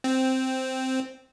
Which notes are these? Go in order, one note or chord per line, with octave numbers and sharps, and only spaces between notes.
C4